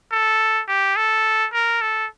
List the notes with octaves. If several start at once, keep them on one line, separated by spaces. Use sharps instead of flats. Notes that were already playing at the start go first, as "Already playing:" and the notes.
A4
G4
A4
A#4
A4